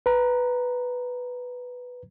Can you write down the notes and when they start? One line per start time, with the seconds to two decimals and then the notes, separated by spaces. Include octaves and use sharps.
0.06 B4 A#5